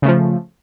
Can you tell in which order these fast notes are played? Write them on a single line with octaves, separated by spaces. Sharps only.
C#3 A3 F3